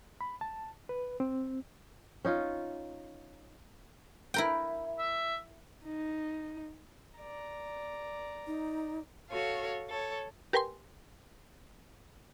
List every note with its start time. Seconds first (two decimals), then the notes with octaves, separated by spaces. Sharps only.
0.21 B5
0.41 A5
0.89 B4
1.20 C4
2.25 C#4 D#4 F4
4.34 E4 A#4 G5
4.98 E5
5.85 D#4
7.19 D5 A#5
8.47 D#4
9.30 F#4 A4 C#5 F5
9.88 A4 C#5
10.53 G4 A#4 B4 G5 G#5 C6